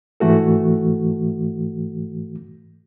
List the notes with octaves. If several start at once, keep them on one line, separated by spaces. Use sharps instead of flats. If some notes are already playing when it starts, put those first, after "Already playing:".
G#2 E3 A3 F#4 A4